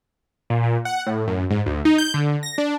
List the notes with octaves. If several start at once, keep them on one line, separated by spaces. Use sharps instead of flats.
A#2
A#2
F#5
A2
F#2
G#2
D2
D#4
G6
D3
A#6
D4